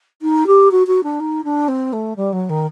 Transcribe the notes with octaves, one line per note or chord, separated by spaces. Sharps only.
D#4
G4
F#4
F#4
D4
D#4
D4
C4
A3
G3
F#3
D#3